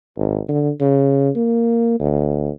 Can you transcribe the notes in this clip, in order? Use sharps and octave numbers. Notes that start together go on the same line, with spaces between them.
G#1
D3
C#3
A#3
D2